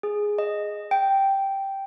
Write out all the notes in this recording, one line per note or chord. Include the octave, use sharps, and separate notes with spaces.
G#4
D#5
G5